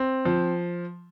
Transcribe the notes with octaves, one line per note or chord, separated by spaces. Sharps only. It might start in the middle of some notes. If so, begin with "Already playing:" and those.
Already playing: C4
F3